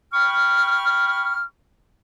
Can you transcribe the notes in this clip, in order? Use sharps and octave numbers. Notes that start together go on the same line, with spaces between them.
G5 B5 C#6 F6